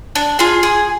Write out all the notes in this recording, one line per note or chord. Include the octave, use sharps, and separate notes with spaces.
D4
F4 G#4
G#4